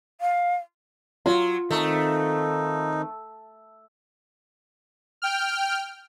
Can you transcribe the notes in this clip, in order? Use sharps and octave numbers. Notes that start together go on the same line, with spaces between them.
F5
F#3 F4
D#3 A3 C4 D#4
G5 F6